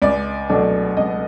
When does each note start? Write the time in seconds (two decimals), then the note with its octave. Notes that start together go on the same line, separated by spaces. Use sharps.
0.02 C#2 D5
0.50 B2 F#3 A3 D4
0.97 C#2 D#5